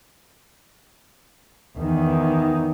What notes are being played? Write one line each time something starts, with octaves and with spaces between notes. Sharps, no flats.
E2 D#3